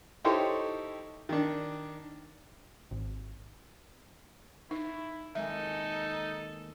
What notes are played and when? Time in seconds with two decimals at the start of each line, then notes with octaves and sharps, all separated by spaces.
0.24 D#4 E4 G4 A4 C5 C#5
1.29 D#3 D4
2.91 G#1
4.71 D#4 E4
5.35 D#2 G#3 D#4 A4 E5 G#5